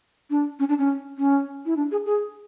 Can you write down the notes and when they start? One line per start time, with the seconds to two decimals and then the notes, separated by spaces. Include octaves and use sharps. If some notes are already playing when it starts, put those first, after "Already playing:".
0.30 D4
0.59 C#4
0.69 D4
0.79 C#4
1.18 C#4
1.66 E4
1.76 D4
1.91 G#4
2.06 G#4